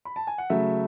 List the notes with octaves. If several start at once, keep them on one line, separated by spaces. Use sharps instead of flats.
B5
A5
G#5
F#5
C#3 F#3 A3 E5